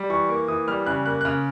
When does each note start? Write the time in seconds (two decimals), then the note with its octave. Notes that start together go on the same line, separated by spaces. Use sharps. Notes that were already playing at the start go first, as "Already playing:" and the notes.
Already playing: G3
0.10 E3 C#6
0.29 A#3
0.48 E3 D#6
0.68 G3 F6
0.86 C#3 F#6
1.06 A#3 F#6
1.21 F#6
1.25 C#3 F6